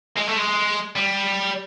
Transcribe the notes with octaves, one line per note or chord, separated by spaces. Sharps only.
G#3
A3
G#3
G3